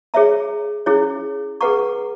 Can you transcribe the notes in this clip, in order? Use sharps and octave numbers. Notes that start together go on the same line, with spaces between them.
G#4 C#5 E5 A#5
C#4 E4 G#4 C#5
G#4 B4 F#5 A#5 C#6